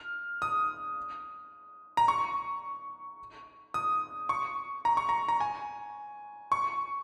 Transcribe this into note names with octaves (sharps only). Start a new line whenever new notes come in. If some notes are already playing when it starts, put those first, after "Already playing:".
Already playing: F6
D#6
A#5
C#6
D#6
C#6
A#5
C#6
A#5
A#5
G#5
C#6